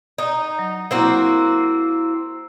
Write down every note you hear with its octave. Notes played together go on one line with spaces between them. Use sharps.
D#4
F#3
A#3 C4 E4 F#4 E6